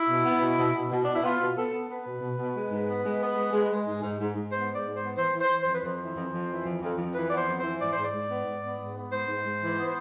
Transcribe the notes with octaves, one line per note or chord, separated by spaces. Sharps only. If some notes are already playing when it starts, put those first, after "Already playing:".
Already playing: E4
B2
B3
B2
B2
B2
B2
B2 D4
E4
B3 F4
B2
B3 A4
B3
B3 B4
B2
B2
B2
G#3
G#2
B3
G#3
B3
G#3
G#3
G#3
G#2
G#2
G#2
G#2
B3 C5
G#3
D5
G#2
C5
B3
E3 C5
E3
C5
E3
C5
F2
B4
F2 C5
E3
F2
F2
E3
F2
F2
F2
E3 B4
B3 D5
C5
F2
E3 C5
G#2 D5
G#2 C5
D5
G#2
B3
G#2
B3
G#2
B3
G#2 C5
G#2
G#2
E3
B3